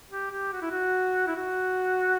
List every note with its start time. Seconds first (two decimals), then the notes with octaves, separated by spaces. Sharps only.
0.10 G4
0.31 G4
0.52 F#4
0.62 E4
0.71 F#4
1.27 E4
1.36 F#4